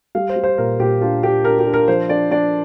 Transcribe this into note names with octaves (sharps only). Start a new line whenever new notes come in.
G3 F5
C5
G3
C5
A#2 A#4
A#2 G4
D4 F4
D4 G4
D4 A#4
G4
D4
A#4
F3 C5
D4 D5
D4 D5